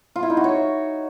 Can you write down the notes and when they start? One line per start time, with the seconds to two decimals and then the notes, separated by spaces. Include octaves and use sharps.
0.16 F4
0.23 E4
0.30 D#4
0.37 F#4
0.44 C#5